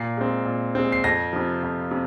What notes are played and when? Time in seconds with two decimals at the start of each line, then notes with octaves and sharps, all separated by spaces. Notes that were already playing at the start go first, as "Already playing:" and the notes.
Already playing: A#2 C7
0.17 G#3 C4
0.46 A#2
0.75 G#3 C4
0.92 C7
1.04 F2 A#6
1.33 C3 F3
1.63 F2
1.91 C3